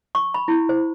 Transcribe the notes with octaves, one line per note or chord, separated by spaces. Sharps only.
C#6
B5
E4
C5